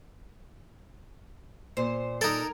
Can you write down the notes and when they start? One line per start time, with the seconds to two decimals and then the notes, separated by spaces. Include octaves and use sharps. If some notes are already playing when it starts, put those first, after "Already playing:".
1.77 A#2 C5
2.21 D#4 A4 A#4 G#5